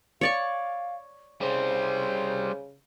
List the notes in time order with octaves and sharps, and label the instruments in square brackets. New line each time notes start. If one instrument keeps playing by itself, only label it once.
[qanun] C#5 D5 C#6 [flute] F5
[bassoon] C#3 [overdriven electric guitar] G3 C4 [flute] C5